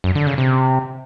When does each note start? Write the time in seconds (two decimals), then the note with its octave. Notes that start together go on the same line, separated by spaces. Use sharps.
0.04 F#2
0.15 D3
0.27 C#3
0.38 C3